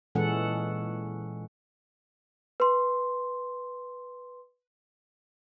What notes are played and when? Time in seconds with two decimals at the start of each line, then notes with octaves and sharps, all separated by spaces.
0.15 A#2 E3 G#3 C#4 A4 F#5
2.60 B4 C6